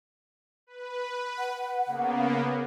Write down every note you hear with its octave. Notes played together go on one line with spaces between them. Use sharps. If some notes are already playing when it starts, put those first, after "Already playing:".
B4
F#5
C#3 A#3 B3